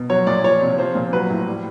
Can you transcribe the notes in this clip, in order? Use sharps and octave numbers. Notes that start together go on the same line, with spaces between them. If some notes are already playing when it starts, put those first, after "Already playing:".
Already playing: B2
F#3 C#5
A#2 D5
F3 C#5
C3
F3 C5
A#2
F#3 B4
A2
G3